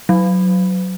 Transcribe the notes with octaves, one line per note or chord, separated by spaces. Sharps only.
F#3